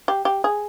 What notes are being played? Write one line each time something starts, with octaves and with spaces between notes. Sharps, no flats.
G4
G4
G#4